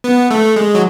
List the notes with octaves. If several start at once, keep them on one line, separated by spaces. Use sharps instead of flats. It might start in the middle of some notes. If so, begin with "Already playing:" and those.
B3
A3
G#3
F#3